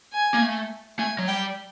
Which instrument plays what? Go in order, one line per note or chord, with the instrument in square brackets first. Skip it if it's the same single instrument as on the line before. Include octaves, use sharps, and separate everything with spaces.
[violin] G#5
[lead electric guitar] A#3
A3
[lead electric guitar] A3 [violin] G#5
[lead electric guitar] F#3
[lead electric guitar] G3 [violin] G5